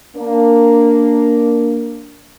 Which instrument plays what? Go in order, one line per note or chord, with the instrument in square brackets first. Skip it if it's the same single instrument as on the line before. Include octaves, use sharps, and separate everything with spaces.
[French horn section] A#3 D4